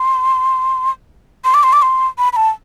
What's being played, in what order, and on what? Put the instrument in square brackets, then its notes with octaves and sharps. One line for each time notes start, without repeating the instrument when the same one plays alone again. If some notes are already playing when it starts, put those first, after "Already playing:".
Already playing: [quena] C6
C6
D6
C6
D6
C6
B5
B5
A5